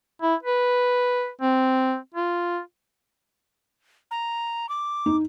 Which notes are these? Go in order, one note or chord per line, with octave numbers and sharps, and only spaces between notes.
E4
B4
C4
F4
A#5
D6
D#4